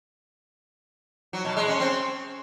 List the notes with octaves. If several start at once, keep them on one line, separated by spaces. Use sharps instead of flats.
F#3
B2
G#3
C#4
C4